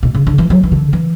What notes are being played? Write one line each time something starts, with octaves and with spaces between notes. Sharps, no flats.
B2
C#3
D3
E3
F#3
E3
D3
E3